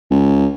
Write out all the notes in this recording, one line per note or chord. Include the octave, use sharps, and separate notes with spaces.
C#2